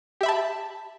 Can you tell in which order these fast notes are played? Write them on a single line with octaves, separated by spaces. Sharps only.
G4 E5 B5 A5